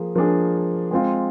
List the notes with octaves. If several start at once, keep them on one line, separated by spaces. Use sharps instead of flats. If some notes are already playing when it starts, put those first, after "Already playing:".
Already playing: F3 A#3 G#4
F3 A#3 D4 G#4
G#3 C4 F4